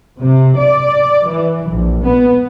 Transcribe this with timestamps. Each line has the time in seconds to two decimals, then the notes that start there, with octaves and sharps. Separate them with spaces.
0.19 C3
0.58 D5
1.29 E3
1.70 A#1
2.02 B3